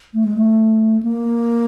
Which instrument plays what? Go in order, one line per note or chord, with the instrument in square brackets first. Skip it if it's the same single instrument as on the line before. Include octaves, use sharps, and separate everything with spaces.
[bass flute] A3
G#3
A3
A#3